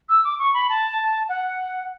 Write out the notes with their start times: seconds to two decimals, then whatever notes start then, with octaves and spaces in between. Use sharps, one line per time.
0.09 E6
0.24 D6
0.39 C#6
0.54 B5
0.69 A5
1.29 F#5